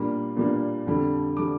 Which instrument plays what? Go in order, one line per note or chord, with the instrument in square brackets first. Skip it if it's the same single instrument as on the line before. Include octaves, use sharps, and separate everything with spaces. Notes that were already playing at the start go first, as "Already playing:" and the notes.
Already playing: [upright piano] A#2 G3 A#3 D4
A#2 G3 A#3 D4
F2 D3 G3 D4
D3 G3 D4 D6